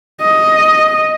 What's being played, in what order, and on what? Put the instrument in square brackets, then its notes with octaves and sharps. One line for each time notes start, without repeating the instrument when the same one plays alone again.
[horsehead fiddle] D#5